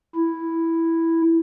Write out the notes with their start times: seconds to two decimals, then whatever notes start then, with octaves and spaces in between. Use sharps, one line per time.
0.16 E4